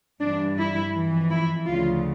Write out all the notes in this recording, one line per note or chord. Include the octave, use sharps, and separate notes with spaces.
G2 E3 D4
E4
F2 E3
E4
D2 C#3 F3 F4